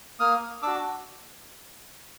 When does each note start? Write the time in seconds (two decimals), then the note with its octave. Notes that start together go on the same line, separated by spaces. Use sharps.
0.19 A#3 D#6 F6
0.62 D4 F#4 D6 E6